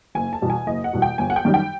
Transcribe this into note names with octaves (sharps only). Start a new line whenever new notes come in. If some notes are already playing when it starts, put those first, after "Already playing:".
F#1 G#5
A5
E2 B2 G3
G#5
F#1 D#5
F#5
E2 B2 G3
G5
G1 G#5
F#5
G5
F#2 D#3 G3
G5